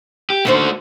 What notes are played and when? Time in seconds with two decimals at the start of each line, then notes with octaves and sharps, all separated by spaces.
0.30 G4
0.45 D#2 D3 A3 F#4 C5